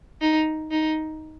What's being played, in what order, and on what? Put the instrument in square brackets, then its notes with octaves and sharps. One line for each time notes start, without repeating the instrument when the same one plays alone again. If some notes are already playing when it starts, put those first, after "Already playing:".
[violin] D#4
D#4